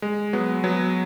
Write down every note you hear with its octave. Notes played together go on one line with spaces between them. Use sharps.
G#3
F#3 B3
F#3 B3